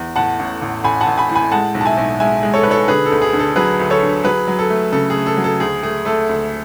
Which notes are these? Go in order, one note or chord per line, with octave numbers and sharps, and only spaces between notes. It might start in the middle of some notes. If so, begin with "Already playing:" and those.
Already playing: E2
A2 F#5 A5
A1
A1
A1 G#5 B5
F#5 A5
A1
G#5 B5
A2
G#5 B5
G#3 F#5 A5
B1
A5
E5 G#5
B1
G#3 E5 G#5
G#3
A4 C#5
B1 B4
A4 C#5
D3 G#4 B4
A4
D2
G#4
D3
A4
F#3 G#4 B4
D2
A4 C#5
D3
F#3 G#4 B4
F#3
A4
A3
C#3 A4
G#4
A3
A4
F#3
A4
D2 G#4
A3 G#4
A3 A4
D2